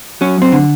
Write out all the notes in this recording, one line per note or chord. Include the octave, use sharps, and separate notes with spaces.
F#3 C#4
F#2 C4
D3